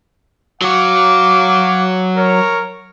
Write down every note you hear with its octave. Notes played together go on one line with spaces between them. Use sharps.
F#3 F#4 F5 D6
A#4 C#5